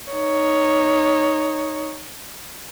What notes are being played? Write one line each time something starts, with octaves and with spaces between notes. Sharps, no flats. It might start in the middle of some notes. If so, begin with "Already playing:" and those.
D#4 C#5